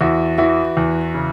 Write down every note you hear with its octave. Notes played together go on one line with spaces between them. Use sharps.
E2 E4 F#4
E3 E4 F#4
E2
C#3